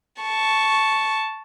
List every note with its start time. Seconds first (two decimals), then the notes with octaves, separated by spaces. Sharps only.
0.22 A5 C#6